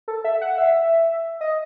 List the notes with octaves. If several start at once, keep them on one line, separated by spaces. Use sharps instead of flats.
A4
E5
F#5
E5
D#5